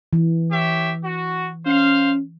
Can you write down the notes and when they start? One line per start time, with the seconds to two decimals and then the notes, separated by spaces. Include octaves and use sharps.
0.13 E3
0.50 G4 C#5 E5
1.03 F#4
1.66 C#4 C5 F5